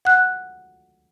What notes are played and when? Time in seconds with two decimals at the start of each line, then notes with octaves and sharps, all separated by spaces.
0.05 F#5 F#6